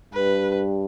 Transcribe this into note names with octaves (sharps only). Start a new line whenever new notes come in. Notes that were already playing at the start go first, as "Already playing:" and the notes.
G2 B4